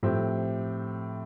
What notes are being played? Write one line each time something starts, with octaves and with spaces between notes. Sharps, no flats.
A2 F3 C4 G4